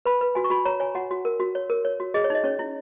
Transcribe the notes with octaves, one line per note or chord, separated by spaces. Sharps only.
B4 B5
B4
F#4 G#5
C#6
F#4 B5
C#5 A#5
C#5 G#5
F#4 F#5
F#4
A#4
F#4
C#5
A#4
C#5
F#4
G#4 D#5
C#5
D#4 D#5
C#4 C#5
E4